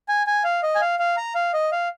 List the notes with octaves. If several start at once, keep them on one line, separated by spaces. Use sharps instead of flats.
G#5
G#5
F5
D#5
G#5
F5
F5
A#5
F5
D#5
F5